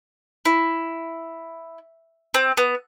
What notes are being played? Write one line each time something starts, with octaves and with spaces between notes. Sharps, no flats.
E4
C4
B3